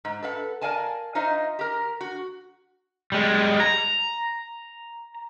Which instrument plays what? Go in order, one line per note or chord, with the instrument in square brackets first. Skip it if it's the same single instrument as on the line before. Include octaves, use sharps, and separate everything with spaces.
[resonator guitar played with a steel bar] G#2
A4 B4 F5 F#5
A#4 D5 F5 G#5 A5
D#4 F4 C5 D#5 E5
G4 A#4
F#4
[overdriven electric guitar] G3 G#3
A#5